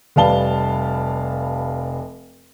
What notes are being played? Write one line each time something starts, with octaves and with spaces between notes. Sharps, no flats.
F1 G3 B4 F5 A5 G7